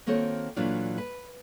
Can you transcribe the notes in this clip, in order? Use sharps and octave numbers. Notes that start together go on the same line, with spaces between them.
D#3 A#3 C4 F#4 A4 C#5
A#2 E3 F#3 A3 D4 F4
B4